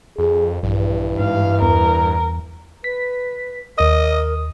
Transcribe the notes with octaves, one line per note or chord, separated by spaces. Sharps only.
F2 G#4
A#1 G2 E3
G#2 F5
E2 A#4
B4 B6
D#2 A#4 D#5 D#6